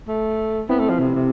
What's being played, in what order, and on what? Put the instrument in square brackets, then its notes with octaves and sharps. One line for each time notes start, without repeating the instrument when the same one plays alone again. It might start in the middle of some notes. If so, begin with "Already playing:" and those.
[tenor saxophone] A3
[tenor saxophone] B3 [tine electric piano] C4 E4
[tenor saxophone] A3
F3
C3
C3